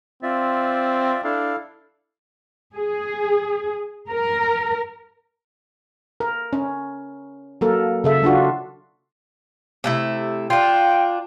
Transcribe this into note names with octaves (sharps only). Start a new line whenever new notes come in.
C4 F4 D5 E5
D4 E4 A4 F5
G#4
A#4
A#4
C#4
F#3 A#3 A4 A#4
C#3 A4 E5
F#3 D4 F4 F#4
C3 A3 E4
D4 F4 G5